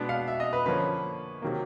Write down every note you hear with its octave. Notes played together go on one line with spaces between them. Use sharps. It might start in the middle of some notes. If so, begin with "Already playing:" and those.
Already playing: B2 G#3 B3 D4
F5
E5
D#5
B4
D3 F3 A#3 C#4 B4
C3 D#3 F#3 A#3